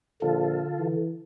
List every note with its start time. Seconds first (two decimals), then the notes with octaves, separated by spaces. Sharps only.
0.22 A#1 D3 F4 A4
0.79 E3